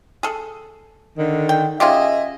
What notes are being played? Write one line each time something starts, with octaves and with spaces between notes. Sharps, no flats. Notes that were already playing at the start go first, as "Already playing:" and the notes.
G#4 A4
D3 D#3
G5
C#4 F4 G4 G#4 D#5 E5